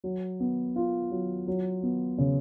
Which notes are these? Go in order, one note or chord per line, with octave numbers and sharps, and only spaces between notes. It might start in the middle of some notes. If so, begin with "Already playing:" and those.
F#3
B3
F4
F#3
F#3
B3
C#3